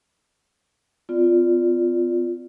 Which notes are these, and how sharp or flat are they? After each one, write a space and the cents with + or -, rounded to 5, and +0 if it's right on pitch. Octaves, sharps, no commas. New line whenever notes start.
B3 +40 F4 +0 D5 +0